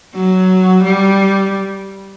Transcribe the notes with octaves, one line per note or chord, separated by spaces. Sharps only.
F#3
G3